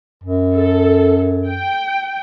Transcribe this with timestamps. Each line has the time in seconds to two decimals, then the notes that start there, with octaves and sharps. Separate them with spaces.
0.24 F#2
0.54 A4
1.47 G5